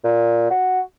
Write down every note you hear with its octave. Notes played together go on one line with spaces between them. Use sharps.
A#2
F#4